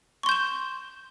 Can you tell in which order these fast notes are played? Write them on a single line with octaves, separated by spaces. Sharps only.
C#6 C6 G6 E7